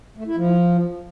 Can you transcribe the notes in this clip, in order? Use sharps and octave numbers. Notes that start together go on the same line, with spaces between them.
A3
E4
F3